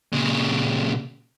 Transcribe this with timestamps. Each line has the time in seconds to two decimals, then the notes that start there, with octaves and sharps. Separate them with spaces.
0.13 A#2 C#3